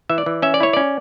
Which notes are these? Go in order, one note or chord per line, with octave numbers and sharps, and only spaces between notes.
E3 E5
D5
E3
C#4 E5
D5
E4 C#5
C#4 D5